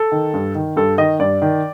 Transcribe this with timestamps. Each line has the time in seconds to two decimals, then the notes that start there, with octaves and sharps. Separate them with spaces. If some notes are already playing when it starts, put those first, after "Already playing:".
Already playing: A4
0.12 D#3
0.34 G2
0.55 D#3
0.76 G2 A4
0.98 D#3 D#5
1.19 G2 D5
1.42 D#3